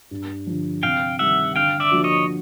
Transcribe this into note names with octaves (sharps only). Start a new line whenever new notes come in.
G2
D3 F3
C3 F5 G5
D#3 G3 E5 F#5
D3 F5 G5
D5 E5
F3 A#3 D4 F#4
C#5 D#5